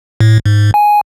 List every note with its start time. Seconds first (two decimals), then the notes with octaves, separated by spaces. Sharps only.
0.21 A2
0.46 G#2
0.74 G#5